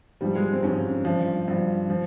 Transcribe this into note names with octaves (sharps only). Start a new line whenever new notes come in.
G#2 F3 G3
G#3
C4
G#2 F3 C#4
G2 F3
G2 F3
F3